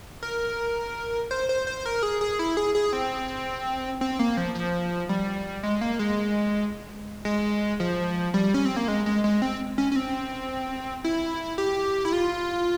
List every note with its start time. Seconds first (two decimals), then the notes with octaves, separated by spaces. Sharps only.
0.23 A#4
1.31 C5
1.49 C5
1.67 C5
1.86 A#4
2.03 G#4
2.21 G#4
2.39 E4
2.57 G#4
2.75 G#4
2.93 C4
4.01 C4
4.19 A#3
4.37 F3
4.55 F3
5.09 G3
5.63 G#3
5.81 A#3
5.99 G#3
7.25 G#3
7.80 F3
8.34 G3
8.54 C#4
8.65 C4
8.76 A#3
8.88 G#3
9.06 G#3
9.24 G#3
9.42 C4
9.78 C#4
9.92 C#4
9.96 C4
11.04 E4
11.58 G4
12.05 E4
12.13 F4